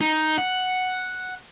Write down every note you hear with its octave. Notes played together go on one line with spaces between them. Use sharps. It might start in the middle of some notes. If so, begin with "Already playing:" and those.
D#4
F#5